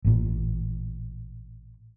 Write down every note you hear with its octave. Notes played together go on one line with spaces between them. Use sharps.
A1 A#2